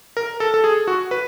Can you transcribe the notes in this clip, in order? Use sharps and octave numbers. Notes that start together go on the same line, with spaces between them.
A#4
A4
A4
G#4
F#4
B4